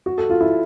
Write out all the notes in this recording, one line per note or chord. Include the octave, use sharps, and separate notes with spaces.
F#4
A4
F4
E4